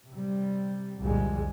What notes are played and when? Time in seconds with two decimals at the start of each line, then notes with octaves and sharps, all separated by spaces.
0.10 C3 G3
1.00 C2 F2 A#2 D3 G3 G#3